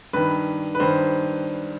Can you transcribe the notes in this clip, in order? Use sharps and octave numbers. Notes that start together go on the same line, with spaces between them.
G2 D#3 B4
B4
G2 D#3 C5